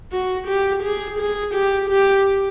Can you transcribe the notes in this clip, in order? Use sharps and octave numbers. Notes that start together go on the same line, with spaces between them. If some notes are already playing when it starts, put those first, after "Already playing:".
F#4
G4
G#4
G#4
G4
G4